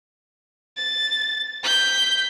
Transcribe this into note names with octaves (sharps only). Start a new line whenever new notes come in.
A6
G6 B6